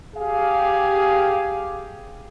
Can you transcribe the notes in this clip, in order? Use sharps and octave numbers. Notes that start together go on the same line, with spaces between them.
G4 G#4 F5